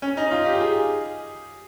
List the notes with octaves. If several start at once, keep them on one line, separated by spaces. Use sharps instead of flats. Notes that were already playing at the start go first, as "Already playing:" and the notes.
C#4
D#4
F4
G4
G#4